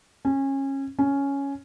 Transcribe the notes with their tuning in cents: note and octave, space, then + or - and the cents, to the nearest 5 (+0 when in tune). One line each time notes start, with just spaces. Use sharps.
C#4 -25
C#4 +5